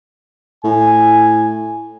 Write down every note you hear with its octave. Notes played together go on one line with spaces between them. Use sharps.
A2 G#5